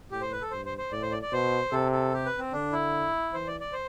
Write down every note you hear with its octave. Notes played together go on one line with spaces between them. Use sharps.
A2 G4
C5
B4
A4
G2 C5
C5
C5
A2 D5
C5
D5
D5
B2 C5
C3 A4
A4
G4
B4
C4
D3 D4
E4
E3 C5
D5
D5
C5